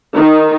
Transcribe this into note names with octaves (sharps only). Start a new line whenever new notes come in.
D#3